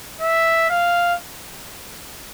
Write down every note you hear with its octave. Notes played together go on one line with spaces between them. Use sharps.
E5
F5